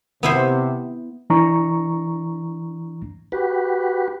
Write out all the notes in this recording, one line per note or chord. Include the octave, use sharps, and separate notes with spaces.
C3 B3 E4 C5
E3 D4 A#5 C#6
F#4 G4 B4